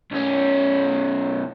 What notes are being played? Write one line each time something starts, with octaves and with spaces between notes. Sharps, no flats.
B1 C#4